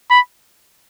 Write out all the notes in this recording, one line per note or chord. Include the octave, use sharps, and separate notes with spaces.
B5